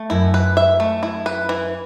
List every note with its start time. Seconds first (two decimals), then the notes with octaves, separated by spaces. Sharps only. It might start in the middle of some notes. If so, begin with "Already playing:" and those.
Already playing: A3
0.10 F#2 E4
0.34 B4
0.57 E5
0.80 A3
1.03 E4
1.26 B4
1.49 E3